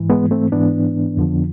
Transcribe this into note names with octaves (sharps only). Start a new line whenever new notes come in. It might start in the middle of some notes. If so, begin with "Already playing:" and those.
Already playing: G#2 E3
G#3 B3
A3 C4
G#2 E3 B3 D4
F2 D3 F3